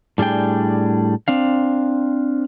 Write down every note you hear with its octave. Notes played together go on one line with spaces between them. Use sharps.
A2 G3 D4 G#4 G5
C4 D4 F5